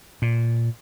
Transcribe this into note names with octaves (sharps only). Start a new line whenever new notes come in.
A#2